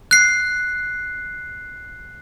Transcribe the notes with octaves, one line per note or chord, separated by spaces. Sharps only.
F#6 C7